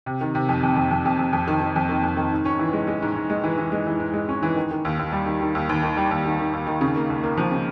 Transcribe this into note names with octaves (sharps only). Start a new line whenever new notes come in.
C3
D#3
C3
F2
F2
F2
F2
F2
F2
F2
D#3
D#3
F2
D#3
F2
D#3
G#2
C#4
E3
G#3
G#3
G#2
G#2
G#3
E3
E3
G#3
E3
G#2
G#3
C#4
E3
D#3
D#3
D#2
D#2
G3
D#3
D#3
D#2
D#2
D#3
G3
D#2
D#3
D#3
D#2
D#3
C#3
A#3
C#2
A#3
F3
C#3